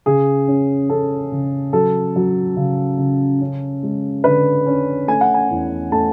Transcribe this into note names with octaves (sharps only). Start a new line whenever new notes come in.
C#3 G#4
C#4
C#4 A4
C#3
F#3 A4
F#3
C#3
C#3
C#4
G#3
D3 B4
C#4
A3 G#5
F#5
G#5
E2
A3 A5